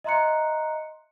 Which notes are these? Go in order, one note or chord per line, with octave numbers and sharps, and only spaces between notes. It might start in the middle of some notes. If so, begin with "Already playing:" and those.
D#5 E5 A#5 C6 F#6 C#7